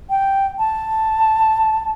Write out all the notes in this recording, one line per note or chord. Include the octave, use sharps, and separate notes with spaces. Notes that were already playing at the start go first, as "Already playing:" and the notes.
G5
A5